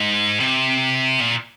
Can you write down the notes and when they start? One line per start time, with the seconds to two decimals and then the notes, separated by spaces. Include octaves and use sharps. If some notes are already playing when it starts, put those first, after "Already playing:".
Already playing: G#2
0.40 C3
1.20 A#2